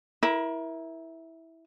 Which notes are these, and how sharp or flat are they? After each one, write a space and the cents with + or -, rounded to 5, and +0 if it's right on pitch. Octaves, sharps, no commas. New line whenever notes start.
E4 -10 A#4 +25